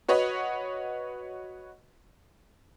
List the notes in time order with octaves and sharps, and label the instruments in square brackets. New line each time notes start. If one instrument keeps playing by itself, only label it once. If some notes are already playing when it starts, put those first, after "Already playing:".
[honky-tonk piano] F#4 B4 C#5 D#5 F#5